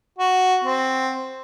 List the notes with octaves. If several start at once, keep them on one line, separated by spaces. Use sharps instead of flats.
F#4
C4